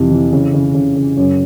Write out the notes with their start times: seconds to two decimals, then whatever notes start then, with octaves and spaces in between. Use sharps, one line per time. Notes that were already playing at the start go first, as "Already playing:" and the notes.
Already playing: F2 C3 E3
0.11 E3
0.32 C#3
0.54 C#3
0.74 C#3
0.96 C#3
1.17 F#2